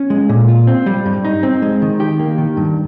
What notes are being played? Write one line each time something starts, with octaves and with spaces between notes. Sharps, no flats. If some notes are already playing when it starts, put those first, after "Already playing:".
Already playing: C#4
G#3
A#2
F4
C4
G3
G2
D#4
C4
G#3
D#3
G4
A#3
D#3
G2